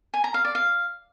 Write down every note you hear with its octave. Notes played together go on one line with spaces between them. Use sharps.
G#5
A#5
F5
D5
F5